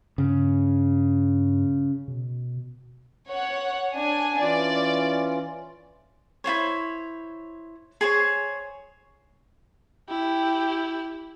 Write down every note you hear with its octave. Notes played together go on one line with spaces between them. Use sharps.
G2 C#3
B2
C#5 F#5
D4 G#5
E3 C#4 F4 D5
E4 F4 C5 C#5
G#4 C5 C#5
E4 G4